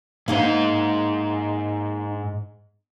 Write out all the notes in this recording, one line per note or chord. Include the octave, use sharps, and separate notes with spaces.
G#2 A#3 D#4 C5 F#5